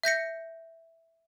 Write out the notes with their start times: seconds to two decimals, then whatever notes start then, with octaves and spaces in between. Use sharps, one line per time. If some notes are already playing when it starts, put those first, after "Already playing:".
0.04 E5 G6 A#6 C#7